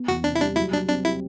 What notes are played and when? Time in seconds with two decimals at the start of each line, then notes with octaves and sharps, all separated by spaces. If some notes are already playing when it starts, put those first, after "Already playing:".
Already playing: B3
0.08 E2 F#4
0.24 C3 D4
0.35 E4
0.40 G3 D4
0.56 F#3 E4
0.73 F#3 D4
0.88 C4 D4
1.05 E4 G4